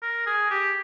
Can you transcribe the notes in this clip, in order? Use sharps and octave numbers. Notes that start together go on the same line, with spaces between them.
A#4
G#4
G4